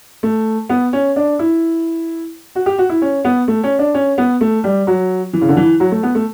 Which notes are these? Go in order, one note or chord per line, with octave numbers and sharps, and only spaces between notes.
A3
B3
C#4
D4
E4
F#4
G4
F#4
E4
C#4
B3
A3
C#4
D4
C#4
B3
A3
G3
F#3
E3
C#3
D3
E3
F#3
A3
B3
A3